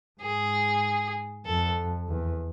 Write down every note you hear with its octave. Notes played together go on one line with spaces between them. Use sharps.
G#2 G#4
F2 A4
E2